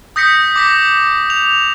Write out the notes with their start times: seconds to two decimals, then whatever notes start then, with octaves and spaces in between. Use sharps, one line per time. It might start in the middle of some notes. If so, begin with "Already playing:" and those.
0.16 D#6 G6 A#6 B6 C#7
0.56 D6 A#6 B6
1.30 F7